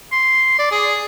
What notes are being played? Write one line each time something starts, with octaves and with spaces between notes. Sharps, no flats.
C6
D5
G#4